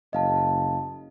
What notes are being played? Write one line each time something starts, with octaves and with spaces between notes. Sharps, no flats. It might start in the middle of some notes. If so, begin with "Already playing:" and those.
F#1 D#5 F5 A5